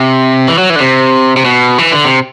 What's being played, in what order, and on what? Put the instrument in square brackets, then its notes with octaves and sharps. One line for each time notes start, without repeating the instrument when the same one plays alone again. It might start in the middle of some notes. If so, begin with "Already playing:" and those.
Already playing: [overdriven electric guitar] C3
E3
F#3
E3
D3
C3
C3
B2
E3
D3
C3